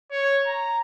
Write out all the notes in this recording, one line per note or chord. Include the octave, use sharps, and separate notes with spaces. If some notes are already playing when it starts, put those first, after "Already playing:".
C#5
A#5